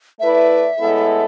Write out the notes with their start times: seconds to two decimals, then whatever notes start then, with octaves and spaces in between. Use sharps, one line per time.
0.20 A3 E4 B4 D5 E5
0.79 A2 G#3 B3 E4 A4